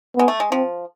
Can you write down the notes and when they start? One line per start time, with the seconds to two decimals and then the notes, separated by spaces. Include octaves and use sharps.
0.16 G#3 B3
0.28 A3
0.40 G#3
0.52 F3 C4